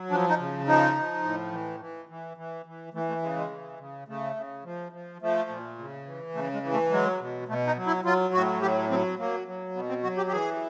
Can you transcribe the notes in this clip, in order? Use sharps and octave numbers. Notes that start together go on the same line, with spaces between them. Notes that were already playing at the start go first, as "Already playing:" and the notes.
Already playing: F#3
F3 D4
D#4
C#3
F3 D#4
F3
A2
E3
E3
E3
E3
E3
E3 A3
A3
C#3 G#3
G#3
E3
C#3
C#3 A3
C#3
F3
F3
F3 A3
A#2
C#3
E3
C#3 A3
G#3
E3
A3
F#3 G#3
B2
B2 A3
D#4
F#3
E4
F#3 F4
A2 F#4
F#3 G4
F#3 C4
F#3 A#3
F#3
B2 B3
C4
F#3 F#4
G4
G4
E3 G#4